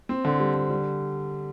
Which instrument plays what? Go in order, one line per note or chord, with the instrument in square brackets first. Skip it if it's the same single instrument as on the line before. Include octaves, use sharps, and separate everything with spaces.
[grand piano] C4
D3
G3
D3
G3